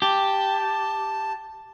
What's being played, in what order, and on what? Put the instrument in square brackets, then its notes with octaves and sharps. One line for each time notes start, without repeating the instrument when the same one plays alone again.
[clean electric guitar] G4 [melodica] A5